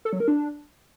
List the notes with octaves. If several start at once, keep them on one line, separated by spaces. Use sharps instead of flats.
A4
F#3
A#4
D4